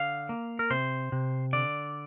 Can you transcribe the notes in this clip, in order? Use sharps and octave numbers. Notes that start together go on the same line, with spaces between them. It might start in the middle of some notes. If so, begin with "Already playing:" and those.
Already playing: D3 F5
A#3
A#4
C3 C5
C3
D3 D5